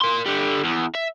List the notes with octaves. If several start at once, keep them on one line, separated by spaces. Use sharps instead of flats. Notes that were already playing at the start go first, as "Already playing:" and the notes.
A#4 C6
D3 G3
E2
E5